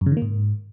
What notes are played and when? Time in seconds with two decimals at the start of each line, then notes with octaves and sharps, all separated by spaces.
0.01 F#2
0.06 C#3
0.12 D#3
0.17 A#3
0.22 G#2